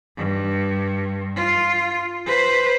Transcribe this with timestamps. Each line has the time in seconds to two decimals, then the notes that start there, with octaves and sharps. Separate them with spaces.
0.17 G2
1.36 F4
2.26 B4 C5